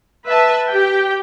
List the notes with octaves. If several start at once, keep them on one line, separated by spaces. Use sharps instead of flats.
B4 E5 A5
G4 G5